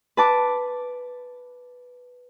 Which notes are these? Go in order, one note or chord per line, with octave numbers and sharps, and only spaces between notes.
B4 A5 D6